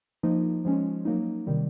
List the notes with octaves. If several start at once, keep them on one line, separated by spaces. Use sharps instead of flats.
F3 A#3 D#4
F3 G#3 C#4
F#3 A#3 D#4
C3 D#3 G3